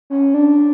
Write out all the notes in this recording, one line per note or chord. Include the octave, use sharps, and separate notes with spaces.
C#4
D4